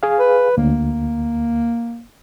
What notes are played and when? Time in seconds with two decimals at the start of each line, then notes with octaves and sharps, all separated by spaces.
0.03 G#4 F5
0.19 B4
0.58 D2 A#3